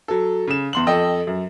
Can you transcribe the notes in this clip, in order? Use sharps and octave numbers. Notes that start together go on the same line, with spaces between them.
F#3 A4
C#3 E7
E2 C6 F#7
F2 A4 D#5 G5
F#2